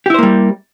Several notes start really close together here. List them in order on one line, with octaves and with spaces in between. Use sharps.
G4 E4 C5 A#3 G3